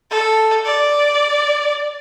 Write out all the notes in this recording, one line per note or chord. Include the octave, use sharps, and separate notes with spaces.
A4
D5